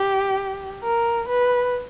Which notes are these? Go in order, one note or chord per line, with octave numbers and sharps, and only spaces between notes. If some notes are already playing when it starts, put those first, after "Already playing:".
Already playing: G4
A#4
B4